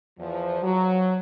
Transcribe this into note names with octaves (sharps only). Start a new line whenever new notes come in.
E2 F3
F#3